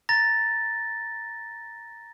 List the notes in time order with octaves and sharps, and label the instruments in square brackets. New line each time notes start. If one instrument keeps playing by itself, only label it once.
[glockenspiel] A#5 A6 A#6